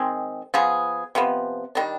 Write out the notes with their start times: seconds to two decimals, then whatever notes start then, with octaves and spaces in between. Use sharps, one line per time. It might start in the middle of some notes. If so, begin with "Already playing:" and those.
Already playing: D#3 G#3 C4
0.54 F3 B3 F4 G#4
1.15 C3 F3 B3
1.75 D#3 G3 D4